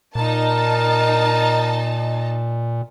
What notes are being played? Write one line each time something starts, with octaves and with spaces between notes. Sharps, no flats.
A#2 D#4 A#4 A5